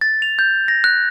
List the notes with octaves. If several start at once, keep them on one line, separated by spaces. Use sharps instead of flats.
A6
F7
G6
A#6
F#6